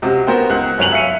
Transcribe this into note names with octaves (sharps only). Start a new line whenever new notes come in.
C#2 C3 F#4
B3 F#4 A#4 C5 G5
C#2 F#5 F#6
G1 F#3 C#5 G#5 F7 F#7
E5 F5 C#7 D#7